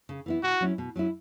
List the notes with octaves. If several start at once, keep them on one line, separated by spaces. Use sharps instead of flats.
C#3
E3 B3 E4
B2 F#4
F#3 C#4 E4
B2
F#3 C#4 E4